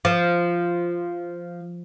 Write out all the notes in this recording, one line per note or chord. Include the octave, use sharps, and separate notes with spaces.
F3